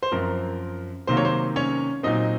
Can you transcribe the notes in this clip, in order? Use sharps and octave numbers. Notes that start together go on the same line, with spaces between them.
C5
F#2 F3 C4 A#4
C3 D#3 F#3 A#3 C5
C#5
C5
C#4 C#5
A#2 F#3 C4 D#4 D#5